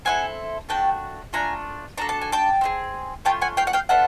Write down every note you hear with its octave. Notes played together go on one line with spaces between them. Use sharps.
C4 E4 A4 F#5 G#5
A3 D4 F#4 G5 A5
A3 D4 F4 G#5 A#5
D4 F#4 A4 A#5
A5
G#5
G5 A5
C4 D#4 G#4
A3 C#4 F4 G5 A5
F#5 G#5
F5 G5
F#5
F5 G5
B3 D4 F4 A4 E5 F#5